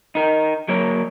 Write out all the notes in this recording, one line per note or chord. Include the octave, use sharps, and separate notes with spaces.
D#4 A#4
F#3 A#3 A#4 C#5